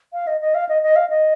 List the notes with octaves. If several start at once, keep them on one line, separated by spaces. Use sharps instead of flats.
F5
D#5
D#5
F5
D#5
D#5
F5
D#5